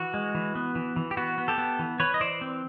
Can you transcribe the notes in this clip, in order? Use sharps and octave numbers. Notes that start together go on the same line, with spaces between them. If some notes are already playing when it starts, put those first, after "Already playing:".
Already playing: E3 F#4
G#3
E3
B3
E3
E3
G4
B3 F#4
B3
G4 A4
B3
E3
E3 B4 C#5
D#5
E3 C5 D5
C4